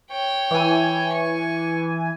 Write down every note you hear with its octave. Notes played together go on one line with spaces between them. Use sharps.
C#5 G5
E3 G#5
C#6